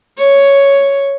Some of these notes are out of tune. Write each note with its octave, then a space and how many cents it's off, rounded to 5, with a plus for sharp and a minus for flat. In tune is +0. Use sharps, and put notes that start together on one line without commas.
C#5 +5